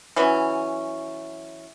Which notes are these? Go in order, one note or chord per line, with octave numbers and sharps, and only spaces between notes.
E3 F#3 C#4